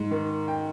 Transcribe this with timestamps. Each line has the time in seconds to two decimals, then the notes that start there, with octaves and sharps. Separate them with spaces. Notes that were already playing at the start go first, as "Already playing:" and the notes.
Already playing: G#2
0.11 D#3
0.48 G5